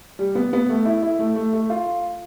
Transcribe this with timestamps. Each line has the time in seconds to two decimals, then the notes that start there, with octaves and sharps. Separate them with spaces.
0.19 G3
0.35 B3
0.53 B3
0.69 A3
0.85 E4
1.02 E4
1.19 A3
1.36 A3
1.53 A3
1.70 F4